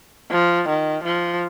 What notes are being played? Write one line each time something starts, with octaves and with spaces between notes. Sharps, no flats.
F3
D#3
F3